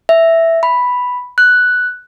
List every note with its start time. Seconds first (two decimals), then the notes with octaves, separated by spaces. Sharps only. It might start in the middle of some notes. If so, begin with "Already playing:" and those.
0.09 E5
0.63 B5
1.38 F#6